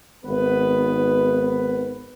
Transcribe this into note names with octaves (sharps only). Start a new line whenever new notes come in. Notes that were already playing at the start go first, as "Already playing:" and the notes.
G#1 B3 B4